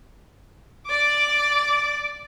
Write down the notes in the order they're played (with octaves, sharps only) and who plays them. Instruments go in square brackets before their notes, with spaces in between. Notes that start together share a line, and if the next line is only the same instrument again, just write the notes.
[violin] D5 D6